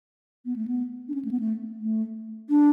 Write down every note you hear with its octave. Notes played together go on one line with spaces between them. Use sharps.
B3
A3
B3
D4
C#4
A3
B3
A3
A3
D4